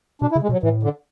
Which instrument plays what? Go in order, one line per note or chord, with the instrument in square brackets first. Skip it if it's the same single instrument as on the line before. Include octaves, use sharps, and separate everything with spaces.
[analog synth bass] B2 [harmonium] D4
[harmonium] E4
[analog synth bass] C#3
[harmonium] G#3
[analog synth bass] B2
[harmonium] F#3
[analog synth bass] A2 [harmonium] E3
[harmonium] D3